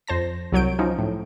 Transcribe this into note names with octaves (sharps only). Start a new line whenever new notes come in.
F2 C5 A5 A#6
C2 F#3 C#5 G6 D7
F3 F#3 C#4 D#4
A2